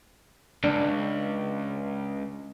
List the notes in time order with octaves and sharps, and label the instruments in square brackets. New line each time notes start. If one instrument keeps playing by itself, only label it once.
[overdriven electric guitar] C#2 [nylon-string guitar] D4